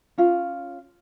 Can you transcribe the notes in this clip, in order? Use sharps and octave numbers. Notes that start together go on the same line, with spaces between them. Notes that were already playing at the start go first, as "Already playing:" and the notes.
C#4 F4